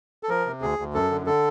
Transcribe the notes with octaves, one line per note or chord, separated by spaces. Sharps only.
A4
F3 A#4
C3
D2 G#4
D2
F#2 A4
D3
D3 A4